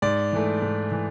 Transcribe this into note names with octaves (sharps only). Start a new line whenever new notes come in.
G#2 D5
E3 A3
G#2
E3